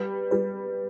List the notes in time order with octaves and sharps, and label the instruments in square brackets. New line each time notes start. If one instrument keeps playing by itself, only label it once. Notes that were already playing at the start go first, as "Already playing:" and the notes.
Already playing: [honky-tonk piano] G3 [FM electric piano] B4
[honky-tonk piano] G3 [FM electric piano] B4